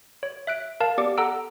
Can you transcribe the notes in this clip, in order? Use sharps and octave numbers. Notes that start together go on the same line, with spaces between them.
C#5
E5 F#6 D7
A#4 F5 A5
B3 G4 D5 D6 C#7
A4 F#5 A#5 E6 D7